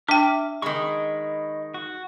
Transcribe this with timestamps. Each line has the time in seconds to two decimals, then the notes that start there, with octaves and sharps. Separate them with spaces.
0.09 D4 E5 G5 D6 F6
0.62 D#3 G#3 D#5 B5 C#6
1.74 F#4